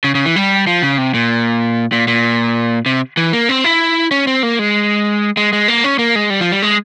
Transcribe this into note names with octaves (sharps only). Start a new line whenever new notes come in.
C#3
C#3
E3
G3
F3
C#3
C3
A#2
A#2
A#2
C3
E3
A#3
C4
E4
C#4
C4
A#3
G#3
G#3
G#3
A#3
C#4
A#3
G#3
G3
F3
G3
G#3